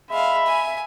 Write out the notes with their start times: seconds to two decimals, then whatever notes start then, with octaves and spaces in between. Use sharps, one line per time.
0.11 G#3 E5 F5 B5
0.46 G#5